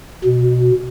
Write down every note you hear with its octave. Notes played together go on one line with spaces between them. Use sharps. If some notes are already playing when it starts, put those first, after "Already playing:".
B2